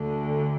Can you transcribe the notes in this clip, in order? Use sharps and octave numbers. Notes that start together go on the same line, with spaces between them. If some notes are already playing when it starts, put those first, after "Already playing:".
Already playing: D2 D3